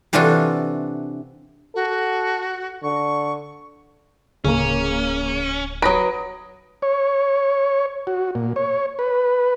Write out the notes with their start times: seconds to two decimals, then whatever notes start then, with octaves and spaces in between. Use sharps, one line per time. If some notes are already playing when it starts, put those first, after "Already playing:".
0.13 C3 E3 D4 F4 F#4 A4
1.75 F#4 A4
2.83 D3 C#6
4.45 D1 C#3 A#3 C#4
5.82 F#3 B4 D#6 A#6 D7
6.82 C#5
8.07 F#4
8.35 A#2
8.56 C#5
8.99 B4